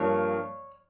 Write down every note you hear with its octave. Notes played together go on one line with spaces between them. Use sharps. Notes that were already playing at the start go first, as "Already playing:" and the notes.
Already playing: G2 F3 A#3 C#5